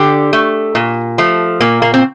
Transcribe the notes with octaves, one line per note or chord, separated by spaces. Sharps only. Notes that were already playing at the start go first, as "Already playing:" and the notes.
Already playing: D3 G4
A3
A#2
F3 A3
A#2 A#3
A#3
C4